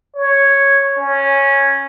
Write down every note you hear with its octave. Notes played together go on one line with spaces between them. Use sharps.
C#5
C#4